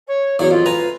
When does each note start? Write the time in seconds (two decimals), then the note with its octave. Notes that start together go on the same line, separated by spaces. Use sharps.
0.07 C#5
0.39 E2 F#3 C#5 D5
0.51 F2 F4
0.66 B4 G#5 A#5